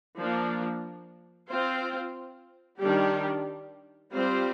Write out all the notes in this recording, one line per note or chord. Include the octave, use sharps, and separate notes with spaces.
F3 A#3 D4
C4 F4 C5
D#3 G3 D4 G4
G3 C4 F4 C5